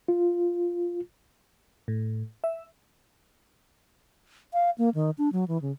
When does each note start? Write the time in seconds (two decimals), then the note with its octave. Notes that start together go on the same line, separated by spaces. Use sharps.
0.08 F4
1.88 A2
2.44 E5
4.53 F5
4.78 A#3
4.95 D#3
5.18 D4
5.33 F#3
5.48 E3
5.62 C#3